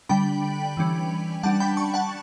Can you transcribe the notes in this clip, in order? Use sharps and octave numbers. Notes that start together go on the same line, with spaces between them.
D3 G3 D4 G5 B5
E3 G3 C#4
G3 D4 F#5 A5
G5 B5
A5 C#6
F#5 A5